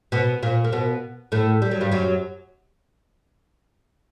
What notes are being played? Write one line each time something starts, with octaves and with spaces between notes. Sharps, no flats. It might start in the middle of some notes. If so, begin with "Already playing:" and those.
B2 B3
A#2 A#3
A#3
B2 B3
A2 A3
G3
F#3
G2 G3
F#2 F#3